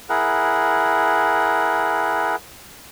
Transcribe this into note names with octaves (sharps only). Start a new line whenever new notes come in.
E4 G#4 A#4 F#5